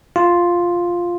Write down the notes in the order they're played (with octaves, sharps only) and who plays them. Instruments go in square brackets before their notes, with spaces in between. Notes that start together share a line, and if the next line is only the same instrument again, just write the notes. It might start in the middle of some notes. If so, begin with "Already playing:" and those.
[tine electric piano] F4